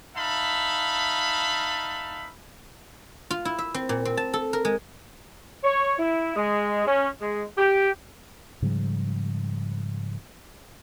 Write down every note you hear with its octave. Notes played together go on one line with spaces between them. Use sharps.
D#4 E5 F5 A5 B5
F4
E4
E5
C4
A#2
C4
A5
A4
A#4
G#3
C#5
E4
G#3
C#4
G#3
G4
G#2 C#3 F3 G3